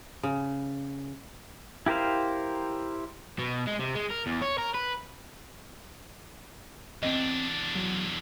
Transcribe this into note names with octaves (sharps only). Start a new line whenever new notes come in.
C#3
E4 G4 A#4 C5 F5
B2
G#3
C3
G#3
A#4
E2
C#5
A#4
B4
E2 C4 D4 D#5
F#3